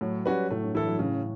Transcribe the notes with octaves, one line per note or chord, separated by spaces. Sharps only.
A2 F#3
G3 C#4 F#4 B4
A2 A3
G2
E3 E4 A4
F#3
A2 C#3